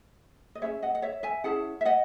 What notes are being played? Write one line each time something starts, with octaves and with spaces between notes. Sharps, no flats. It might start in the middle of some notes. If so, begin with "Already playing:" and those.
D#5
C#4 E4 G#4 B4 C#5 E5
D#5 F#5
F#5
C#5 E5
E5 G#5
C#4 E4 G#4 F#5 A5
E5
D#5 F#5